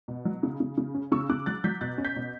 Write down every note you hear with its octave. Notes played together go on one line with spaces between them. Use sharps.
B2
F#3
C#3
C#3
C#3
C#4
C#3 C#6 E6
C#3 D6 F#6
F#3 F#6 A6
F#3 G6 B6
B2 F#6 A6
C#4
G6 B6
B2